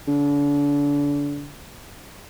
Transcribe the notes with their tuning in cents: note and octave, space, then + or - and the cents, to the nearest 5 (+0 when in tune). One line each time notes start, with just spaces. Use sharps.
D3 -35